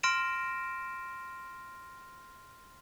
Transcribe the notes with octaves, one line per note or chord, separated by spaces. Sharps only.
C6 F6 A#6 D7 E7